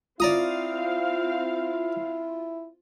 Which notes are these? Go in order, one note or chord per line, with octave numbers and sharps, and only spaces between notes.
C4 E4 F4 D5 F5 A#5 D#6